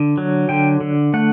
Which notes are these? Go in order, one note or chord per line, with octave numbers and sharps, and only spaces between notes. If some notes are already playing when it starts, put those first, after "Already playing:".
Already playing: D3
F#3
D3 G5
D3
A3 F#5